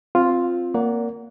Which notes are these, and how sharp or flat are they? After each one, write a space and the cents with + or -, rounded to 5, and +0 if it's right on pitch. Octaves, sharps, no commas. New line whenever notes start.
C4 +0 F4 +0
A#3 +0 D5 -40 F#5 +0